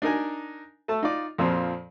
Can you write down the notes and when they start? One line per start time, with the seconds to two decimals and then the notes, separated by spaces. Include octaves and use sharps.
0.02 D4 D#4 A#4 G#5
0.88 A3 A4 A5
1.03 D#4 F4 D5
1.38 F2 A#2 F3 C4